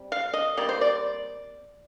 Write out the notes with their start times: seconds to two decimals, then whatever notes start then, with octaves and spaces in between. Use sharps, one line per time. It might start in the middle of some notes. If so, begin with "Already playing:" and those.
Already playing: C3 G3
0.12 F5
0.34 D#5
0.57 C3 G3 A#3 D5
0.69 C5
0.81 D5